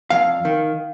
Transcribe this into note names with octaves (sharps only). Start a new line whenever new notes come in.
F2 F5
D#3